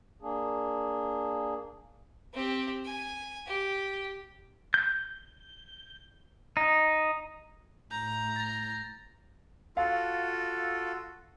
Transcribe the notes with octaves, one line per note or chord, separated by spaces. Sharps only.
A#3 D4 G#4
C4 G4
G#5
G4
G6
D#4
A2 A#5 G6
A6 A#6
F4 F#4 A4 F5